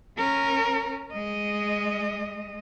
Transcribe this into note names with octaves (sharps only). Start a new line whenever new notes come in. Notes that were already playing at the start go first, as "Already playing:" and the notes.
C#4 A#4
G#3 D#5